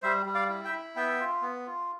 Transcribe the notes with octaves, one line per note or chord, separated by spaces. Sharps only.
G3 C5 E5
G3
D5 F5
E4
E5 G5
E4
B3 E5 G5
F4
B3
F4